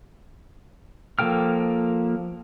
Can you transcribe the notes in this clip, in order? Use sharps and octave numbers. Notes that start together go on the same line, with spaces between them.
F3 A#3 A4 G5 F6